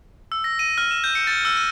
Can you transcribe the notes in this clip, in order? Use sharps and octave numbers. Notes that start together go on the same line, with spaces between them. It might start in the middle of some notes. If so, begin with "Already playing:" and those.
E6
A#6
D#7
F6
E7
G6
C#7
A6
E6
D#7